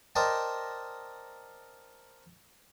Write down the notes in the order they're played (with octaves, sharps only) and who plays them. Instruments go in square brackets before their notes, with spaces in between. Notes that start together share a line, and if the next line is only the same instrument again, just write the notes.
[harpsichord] A#4 C5 D5 D#5 G5 A5